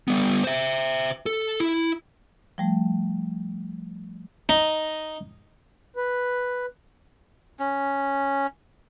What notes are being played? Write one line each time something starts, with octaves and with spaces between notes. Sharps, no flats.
G3 B3
C5 E5
A4
E4
F3 G3 A3
D#4
B4
C#4